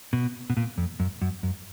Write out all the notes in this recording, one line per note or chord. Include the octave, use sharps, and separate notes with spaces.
B2
B2
A#2
F2
F#2
F#2
F#2